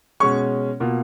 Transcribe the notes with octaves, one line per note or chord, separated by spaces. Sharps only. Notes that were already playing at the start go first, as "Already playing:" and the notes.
B2 G#3 C#4 C#6
B2 A#3 F4